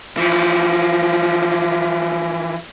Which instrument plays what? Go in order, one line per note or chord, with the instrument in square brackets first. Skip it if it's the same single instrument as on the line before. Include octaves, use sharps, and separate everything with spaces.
[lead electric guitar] E3 F3